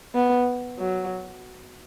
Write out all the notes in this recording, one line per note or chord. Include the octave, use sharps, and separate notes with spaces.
B3
F#3